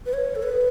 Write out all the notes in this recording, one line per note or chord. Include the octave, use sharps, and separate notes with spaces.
B4
C#5
A4
B4